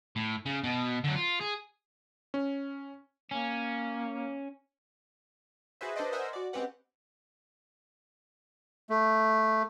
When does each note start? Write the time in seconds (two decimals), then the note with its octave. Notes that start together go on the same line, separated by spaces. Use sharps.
0.16 A2
0.46 C#3
0.64 B2
1.04 D3 F#3
1.16 F4
1.41 G#4
2.34 C#4
3.31 A#3 C#4
5.81 F#4 G#4 B4 C5 E5
5.96 D4 A4 B4 C5 D5 D#5
6.12 A#4 C5 D#5 E5 F#5 G#5
6.33 F#4 D5
6.53 G#3 C4 C#4 G4 B4 F#5
8.90 A3